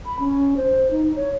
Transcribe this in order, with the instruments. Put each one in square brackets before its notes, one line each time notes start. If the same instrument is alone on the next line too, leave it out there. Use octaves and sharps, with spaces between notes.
[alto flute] B5
C#4
C5
D#4
C#5